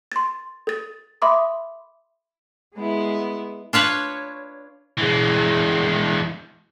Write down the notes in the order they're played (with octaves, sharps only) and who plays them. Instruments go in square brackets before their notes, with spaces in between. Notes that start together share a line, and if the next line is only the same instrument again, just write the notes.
[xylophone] C6 A6
A4 A6
E5 B5 C6 D6 D#6
[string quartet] G#3 B3 E4
[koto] D4 F4 B4 C#5
[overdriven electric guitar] E3 G#3